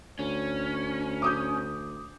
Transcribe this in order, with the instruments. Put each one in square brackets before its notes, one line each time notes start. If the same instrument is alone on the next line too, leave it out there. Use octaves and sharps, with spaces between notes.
[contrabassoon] D2 [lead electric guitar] C#4
[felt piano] D6 D#6 G6